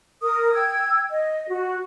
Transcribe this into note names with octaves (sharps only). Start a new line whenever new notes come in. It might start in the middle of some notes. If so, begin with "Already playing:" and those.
A#4 D#6
G5 E6 G#6
D#5
F#4